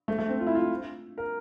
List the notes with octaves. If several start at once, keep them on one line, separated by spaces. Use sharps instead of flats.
A3
A3
C4
F4
E4
F4
A#4